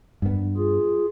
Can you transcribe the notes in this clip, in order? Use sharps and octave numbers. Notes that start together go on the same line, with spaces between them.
G2 B3
F4 G#4